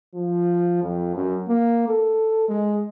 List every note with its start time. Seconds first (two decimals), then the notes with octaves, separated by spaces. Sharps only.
0.14 F3
0.82 F2
1.15 F#2
1.48 A#3
1.88 A4
2.48 G#3